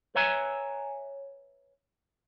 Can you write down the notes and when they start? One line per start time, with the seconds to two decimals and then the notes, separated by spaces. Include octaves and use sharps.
0.15 B4 C#5 E5 G#5 A#5